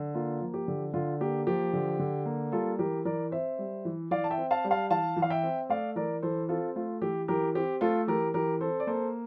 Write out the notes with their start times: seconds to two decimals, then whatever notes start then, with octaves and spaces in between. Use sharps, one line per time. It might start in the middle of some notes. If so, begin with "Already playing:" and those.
Already playing: D3
0.15 A#3 F4
0.41 F3
0.54 G4
0.68 D3
0.94 D3 F4
1.20 A#3 G4
1.47 F3 G4
1.73 D3
1.99 D3
2.26 A#3
2.52 G3 F4 A4
2.79 E3 G4 A#4
3.05 E3 A#4 D5
3.31 C4 C5 E5
3.59 G3
3.85 E3
4.11 E3 D5 F5
4.24 A5
4.31 E5 G5
4.38 C4
4.51 F5 A5
4.64 G3
4.71 F5 A5
4.90 E3 F5 A5
5.17 E3
5.22 F5
5.30 E5 G5
5.43 C4
5.69 A3 D5 F5
5.96 E3 A#4 D5
6.23 E3 A4 C5
6.49 C4 F4 A4
6.76 A3 F4
7.01 E3 G4
7.28 E3 G4 A#4
7.55 C4 G4
7.81 A3 F4 A4
8.08 E3 G4 A#4
8.34 E3 G4 A#4
8.61 C4 A4 C5
8.80 D5
8.87 A#3 A4 C5